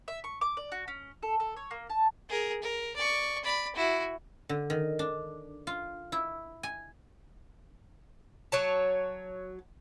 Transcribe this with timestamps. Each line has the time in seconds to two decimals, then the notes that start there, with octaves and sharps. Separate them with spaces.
0.08 E5
0.24 C#6
0.41 D6
0.57 D5
0.72 F#4
0.88 C#4
1.23 A4
1.40 A4
1.57 C#5
1.71 A#3
1.90 A5
2.29 G#4 A#4
2.62 A#4
2.96 D5 C#6
3.44 D5 B5
3.76 E4 F#4
4.49 D3
4.70 D#3
4.99 D4
5.67 F4
6.12 E4
6.63 G#5
8.52 F#3 C#5 A5